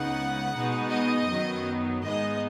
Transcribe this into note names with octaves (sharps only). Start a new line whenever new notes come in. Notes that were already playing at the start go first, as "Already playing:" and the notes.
Already playing: C#2 C#3 B3 D#4 F#5
B2 G#3 B3 D#4
D#5
F#2 D#3 F#3 B3 D#4
G#2 G#3 B3 D#4 D#5